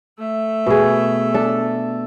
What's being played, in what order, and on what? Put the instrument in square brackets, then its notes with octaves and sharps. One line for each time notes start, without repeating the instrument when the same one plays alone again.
[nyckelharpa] A3 E5
[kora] B2 G#4
D4 A4